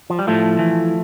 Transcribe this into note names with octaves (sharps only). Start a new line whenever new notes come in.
F3
G3
A2 F3 A3
E3